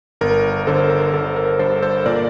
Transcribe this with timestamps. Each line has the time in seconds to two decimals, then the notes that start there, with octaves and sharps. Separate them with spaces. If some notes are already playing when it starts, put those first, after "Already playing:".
0.21 G1 A#4
0.67 D3 A4 C5
0.90 A#4
1.13 D3 A4
1.36 A#4
1.59 G2 A4 C5
1.82 A4 C5
2.06 A#2 A#4 D5